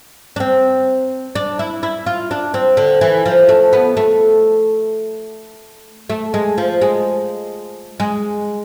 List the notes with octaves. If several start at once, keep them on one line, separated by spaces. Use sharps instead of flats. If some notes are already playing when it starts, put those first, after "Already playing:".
D4
C4
D4
E4
E4
F4
D4
C4
D3
E3
F3
A3
B3
A3
A3
G#3
F3
G#3
G#3